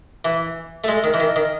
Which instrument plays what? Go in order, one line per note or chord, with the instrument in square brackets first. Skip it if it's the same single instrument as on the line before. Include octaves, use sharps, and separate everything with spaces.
[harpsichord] E3
A3
G#3
D#3
E3
D#3
D#3